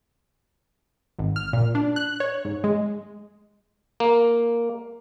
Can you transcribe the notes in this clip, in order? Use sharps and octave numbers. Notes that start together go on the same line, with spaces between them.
G#1
F6
A#2
D4
F#6
C#5
G#2
G#3
A#3